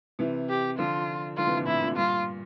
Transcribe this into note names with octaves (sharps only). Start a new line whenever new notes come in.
C3 E3
G4
D3 F3 F4
D3 F3 F4
C3 E3
A#2 D3
A2 C3 E4
A#2 D3
G2 A#2 F4